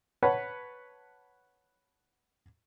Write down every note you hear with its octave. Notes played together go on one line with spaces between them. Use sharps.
B4 C#5 F#5 A5